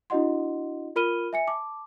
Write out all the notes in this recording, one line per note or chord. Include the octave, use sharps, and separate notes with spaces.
D4 E4 F#4 D#5 F#5 C6
F4 A#4 B5 F6 D#7 G7
E5 G#5 C#7
A5 D6